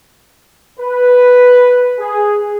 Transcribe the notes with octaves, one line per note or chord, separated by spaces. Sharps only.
B4
G#4